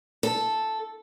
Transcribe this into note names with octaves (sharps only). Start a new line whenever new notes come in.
A4